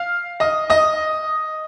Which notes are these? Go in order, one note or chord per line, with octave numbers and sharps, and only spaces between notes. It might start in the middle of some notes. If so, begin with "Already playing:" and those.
Already playing: F5 F6
D#5 D#6
D#5 D#6